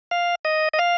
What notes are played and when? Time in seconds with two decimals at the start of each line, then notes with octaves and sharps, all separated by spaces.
0.11 F5
0.45 D#5
0.74 D#5
0.79 F5